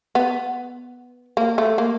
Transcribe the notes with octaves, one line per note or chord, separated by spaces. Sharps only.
B3
A#3
A3
A#3